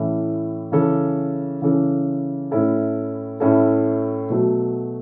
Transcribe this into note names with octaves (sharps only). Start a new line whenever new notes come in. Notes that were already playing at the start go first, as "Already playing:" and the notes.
Already playing: A2 E3 A3 C#4 E4
C#3 E3 C#4 A4
C#3 E3 C#4 A4
A2 A3 C#4 E4 A4
A2 A3 C#4 E4 A4
B2 F#3 A3